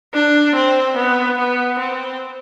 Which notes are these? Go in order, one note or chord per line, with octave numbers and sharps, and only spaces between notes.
D4
C4
B3
B3
C4